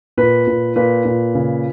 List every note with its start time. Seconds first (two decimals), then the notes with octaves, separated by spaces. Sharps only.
0.17 A#2 B4
0.47 A#2
0.76 A#2 B4
1.05 A#2
1.35 C#3